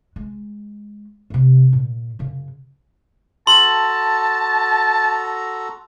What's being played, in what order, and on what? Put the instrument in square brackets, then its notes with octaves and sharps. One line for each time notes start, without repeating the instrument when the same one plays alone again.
[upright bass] G#3
C3 A3
A#2
F#2 C#3
[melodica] F#4 A4 A#5 [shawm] A5 [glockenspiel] C6